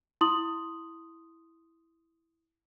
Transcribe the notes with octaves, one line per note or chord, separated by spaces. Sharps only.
E4 C6 D#6 F#7